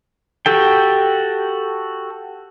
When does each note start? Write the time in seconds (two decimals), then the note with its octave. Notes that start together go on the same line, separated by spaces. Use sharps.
0.46 F#4 G4 A4 G5